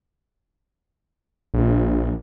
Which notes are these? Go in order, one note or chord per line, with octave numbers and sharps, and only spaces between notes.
A#1